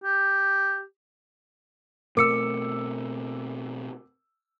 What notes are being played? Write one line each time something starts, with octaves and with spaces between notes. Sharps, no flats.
G4
B2 A3 C4 A#4 D6 E6 C#7